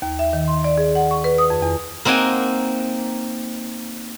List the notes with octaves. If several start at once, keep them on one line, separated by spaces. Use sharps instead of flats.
D#2
E5
D#3
C6
D5
G#4
F#5
C#6
B4
D#6
F2
E2
A#3 C4 D#4 F#5 G#5